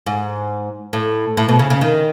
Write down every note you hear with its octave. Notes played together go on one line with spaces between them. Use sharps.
G#2
A2
A2
B2
C#3
C#3
D#3